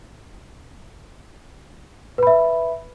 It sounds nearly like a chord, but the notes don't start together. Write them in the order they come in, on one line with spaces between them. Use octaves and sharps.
B4 B5 E5